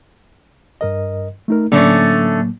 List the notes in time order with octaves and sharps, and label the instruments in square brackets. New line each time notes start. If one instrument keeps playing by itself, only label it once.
[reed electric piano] G2 A#4 D#5
A3 D#4 A#4
[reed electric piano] A2 F#3 A#3 [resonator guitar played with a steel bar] D3 A3 C#4